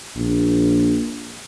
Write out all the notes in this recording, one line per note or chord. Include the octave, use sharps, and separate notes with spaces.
A#1